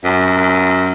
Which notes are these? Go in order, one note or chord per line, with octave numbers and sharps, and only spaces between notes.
F#2